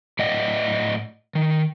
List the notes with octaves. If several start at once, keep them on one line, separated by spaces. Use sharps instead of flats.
A2 D5 D#5 F#5
D#3